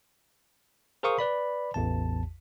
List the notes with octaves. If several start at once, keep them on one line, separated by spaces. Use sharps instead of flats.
G#4 A#4 C5 F5 C#6 D#6
B4 D5 B5
A1 E2 A5